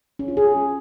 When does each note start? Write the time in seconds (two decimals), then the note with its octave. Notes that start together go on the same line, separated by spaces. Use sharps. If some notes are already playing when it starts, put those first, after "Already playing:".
0.19 C#4
0.28 F4
0.37 G#4